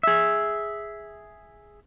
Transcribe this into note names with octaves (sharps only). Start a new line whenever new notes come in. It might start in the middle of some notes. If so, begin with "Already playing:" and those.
G#4 E5